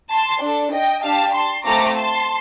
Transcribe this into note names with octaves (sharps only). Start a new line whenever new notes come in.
A5 C6
D4 A4
D#5 G5
D4 G4 F5 A5
A5 C6
A3 C4 F4 A4 A#5 D6
A5 C6